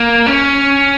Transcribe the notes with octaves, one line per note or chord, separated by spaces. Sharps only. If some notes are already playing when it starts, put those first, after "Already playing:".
Already playing: A#3
C#4